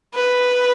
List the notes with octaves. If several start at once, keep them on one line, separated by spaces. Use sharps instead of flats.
B4